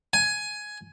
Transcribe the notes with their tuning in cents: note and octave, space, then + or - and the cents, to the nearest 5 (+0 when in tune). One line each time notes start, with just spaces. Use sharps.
G#5 +10